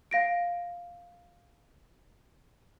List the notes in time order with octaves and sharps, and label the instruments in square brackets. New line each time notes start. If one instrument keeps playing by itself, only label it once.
[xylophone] F5 A#6 D7